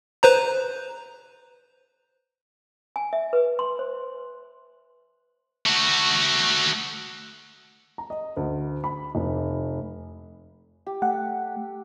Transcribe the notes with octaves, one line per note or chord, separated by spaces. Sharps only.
B4 C5 A#5
G#5
E5
B4
C6
C5
A3 F#4
A#5
D#5
D2
B5
F1
G4
A3 F#5